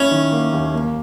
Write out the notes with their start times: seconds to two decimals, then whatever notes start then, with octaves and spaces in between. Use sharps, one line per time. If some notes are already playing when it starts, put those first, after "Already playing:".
Already playing: A#3 C#4 E4
0.11 D#3
0.32 A#3
0.53 D#2
0.74 A#3